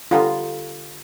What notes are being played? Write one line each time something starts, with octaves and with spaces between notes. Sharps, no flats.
D3 G3 B3 F4 A#5